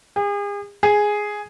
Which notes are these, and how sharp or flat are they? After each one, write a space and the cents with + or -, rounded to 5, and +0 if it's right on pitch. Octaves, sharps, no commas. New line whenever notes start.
G#4 -40
G#4 +0